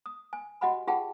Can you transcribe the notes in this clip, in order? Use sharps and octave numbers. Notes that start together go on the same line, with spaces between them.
D#6
G#5
F#4 G4 D#5 F#5 G#5 B5
F4 G4 G#4 F#5 G5 A5